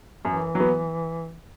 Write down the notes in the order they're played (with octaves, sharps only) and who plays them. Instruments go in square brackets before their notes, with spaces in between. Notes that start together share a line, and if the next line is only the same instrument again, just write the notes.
[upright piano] F#2 [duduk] E3
[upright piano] F#3 B3